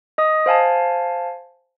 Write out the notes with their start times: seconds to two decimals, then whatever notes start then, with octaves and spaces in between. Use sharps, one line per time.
0.18 D#5 D#6
0.46 C5 F5 G#5 A5